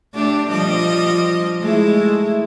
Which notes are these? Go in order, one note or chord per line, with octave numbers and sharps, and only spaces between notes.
A3 D4 G4
F3 G3 D#5
G#3 A3 E4